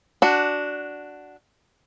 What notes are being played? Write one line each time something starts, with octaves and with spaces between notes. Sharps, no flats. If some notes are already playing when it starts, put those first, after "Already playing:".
D4 F#4